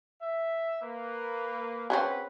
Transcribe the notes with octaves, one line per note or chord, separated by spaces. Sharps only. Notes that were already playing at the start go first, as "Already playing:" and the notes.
E5
A#3 B4
C4 C#4 G#4 B4 F#5